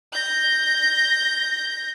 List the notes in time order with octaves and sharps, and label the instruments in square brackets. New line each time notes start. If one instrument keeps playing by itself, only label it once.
[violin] G6 A#6